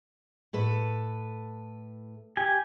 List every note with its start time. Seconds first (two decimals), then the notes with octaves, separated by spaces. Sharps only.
0.53 A2 A4 B4
2.37 G4 G#5